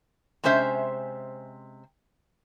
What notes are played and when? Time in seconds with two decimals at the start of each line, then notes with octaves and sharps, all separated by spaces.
0.44 C3 G#3 C#4 C5 E5